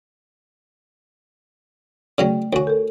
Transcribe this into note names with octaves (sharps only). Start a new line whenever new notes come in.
C#3 F#3 A3 C#4 D5
D2 F#4 C#5 G#5
A4 A#4